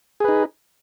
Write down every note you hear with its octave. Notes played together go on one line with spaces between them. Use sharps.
D#4 G#4 B4